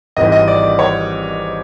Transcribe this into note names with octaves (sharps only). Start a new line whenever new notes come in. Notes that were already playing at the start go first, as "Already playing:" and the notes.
G#1 G#2 E3 G3 C4 D#5
D#5
D5
D5
C#5